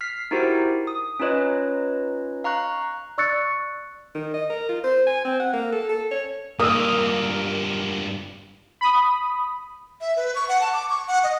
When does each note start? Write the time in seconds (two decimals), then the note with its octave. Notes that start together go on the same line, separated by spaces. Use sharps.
0.01 F6 B6 C7
0.31 D#4 E4 F#4 G4 A#4 C5
0.87 D#6
1.20 C#4 D#4 F4 B4 C#5 D#5
2.44 F5 A#5 C#6 F#6
3.18 D5 C#6 E6 F#6 A6 C#7
4.15 D#3
4.34 D#5
4.50 A#4
4.69 F4
4.84 C5
5.06 G#5
5.25 C4
5.40 F#5
5.53 A#3
5.72 A4
5.89 A4
6.11 C#5
6.59 G2 A#3 F4 A#4 D#6 E6
8.81 B5 D#6
10.01 E5
10.17 B4
10.35 C#6
10.49 F#5
10.61 A5
10.73 D6
10.90 C#6
11.08 F#5
11.24 D#5